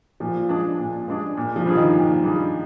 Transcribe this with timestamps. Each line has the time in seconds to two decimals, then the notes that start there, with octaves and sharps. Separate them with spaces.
0.20 A#2 F3
0.49 G#3 D4 G#4
0.79 A#2
1.08 G#3 D4 G#4
1.37 A#2
1.56 F3
1.66 G3 D4 G#4
1.75 D#3
1.95 A#2
2.23 G3 D4 G#4